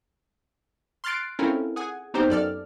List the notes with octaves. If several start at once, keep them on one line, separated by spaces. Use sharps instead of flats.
C6 F6 F#6 A6 C7 D7
C4 C#4 E4 F4 A4 A#4
G#4 F#5 G#5
B3 C4 D#4 G4 A#4 C5
F#2 A4 D5 F6